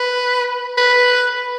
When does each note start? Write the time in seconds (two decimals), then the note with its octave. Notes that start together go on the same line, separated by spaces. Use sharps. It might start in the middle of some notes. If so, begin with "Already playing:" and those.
Already playing: B4
0.77 B4